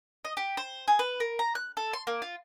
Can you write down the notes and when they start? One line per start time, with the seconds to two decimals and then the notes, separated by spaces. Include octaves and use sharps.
0.25 D#5
0.37 G4
0.57 C5
0.88 G#4
0.99 B4
1.20 A#4
1.39 A#5
1.55 F#6
1.77 A4
1.93 C6
2.07 A#3
2.22 F4